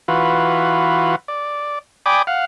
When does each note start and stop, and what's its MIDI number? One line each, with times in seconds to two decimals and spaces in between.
0.08 1.16 52
0.08 1.16 65
0.08 1.16 66
0.08 1.16 71
1.28 1.79 74
2.06 2.22 74
2.06 2.22 79
2.06 2.22 80
2.06 2.22 83
2.06 2.22 86
2.06 2.22 87
2.27 2.45 77
2.27 2.45 78